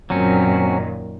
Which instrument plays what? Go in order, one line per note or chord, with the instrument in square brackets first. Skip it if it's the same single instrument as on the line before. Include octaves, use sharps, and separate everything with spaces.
[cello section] F#2 A#2 D#3 [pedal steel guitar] F#3 C4 C#4